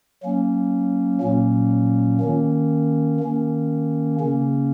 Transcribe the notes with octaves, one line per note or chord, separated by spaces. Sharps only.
F#3 A#3 C#4
A#2 F#3 A#3 C#4
D#3 A#3 C#4
D#3 A#3 C#4
C#3 A#3 C#4